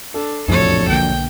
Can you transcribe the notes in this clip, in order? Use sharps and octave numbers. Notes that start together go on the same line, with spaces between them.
D4 A4
E1 A#1 F2 A2 C3 A4 C#5
B1 D3 A#3 G5